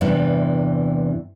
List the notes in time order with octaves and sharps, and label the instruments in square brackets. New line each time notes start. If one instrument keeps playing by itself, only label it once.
[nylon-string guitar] E2 G2 C3 E3 B3